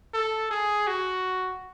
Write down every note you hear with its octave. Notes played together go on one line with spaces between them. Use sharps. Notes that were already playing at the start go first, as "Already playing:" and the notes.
A4
G#4
F#4